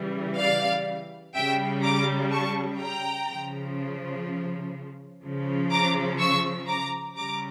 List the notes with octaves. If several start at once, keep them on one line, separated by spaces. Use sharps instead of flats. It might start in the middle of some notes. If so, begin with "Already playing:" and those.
Already playing: C#3 E3 G3
D5 F5
C#3 G3 E5 G5
A#5 D6
A5 C#6
G5 A#5
C#3 F3
C#3 F3
A#5 D6
C#6 E6
A#5 D6
C#3 G3 A#5 D6